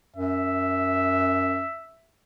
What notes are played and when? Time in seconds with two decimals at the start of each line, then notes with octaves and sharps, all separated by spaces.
0.16 F#2 E5